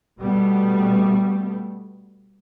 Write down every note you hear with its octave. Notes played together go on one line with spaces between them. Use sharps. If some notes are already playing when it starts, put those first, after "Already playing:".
B2 G3 A3 B3